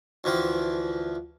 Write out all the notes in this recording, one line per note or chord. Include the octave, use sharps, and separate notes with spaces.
D2 E3 F3 G5